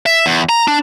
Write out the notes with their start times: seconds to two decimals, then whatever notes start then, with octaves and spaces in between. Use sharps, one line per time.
0.06 E5
0.26 E2
0.49 A#5
0.68 D4